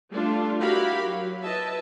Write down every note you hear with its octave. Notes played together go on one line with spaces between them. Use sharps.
G3 A3 D4 F4
E4 F#4 G4 A#4 F5 B5
F#3
E4 B4 D#5 E5 A5